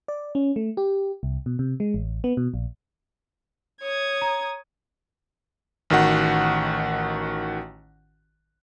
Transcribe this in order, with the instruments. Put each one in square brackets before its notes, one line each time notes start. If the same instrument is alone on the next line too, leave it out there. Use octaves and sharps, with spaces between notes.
[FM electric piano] D5
C#4
A3
G4
C2
B2
C3
G#3
A1
B3
B2
A#1
[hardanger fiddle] C#5 [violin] D#6 G#6
[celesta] A#5
[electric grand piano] A1 D#3 F#4 F#5